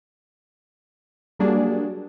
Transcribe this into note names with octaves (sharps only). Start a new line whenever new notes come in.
F#3 G3 A#3 D4 F#4 G#4